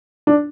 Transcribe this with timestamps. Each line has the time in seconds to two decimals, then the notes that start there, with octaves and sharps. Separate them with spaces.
0.27 D4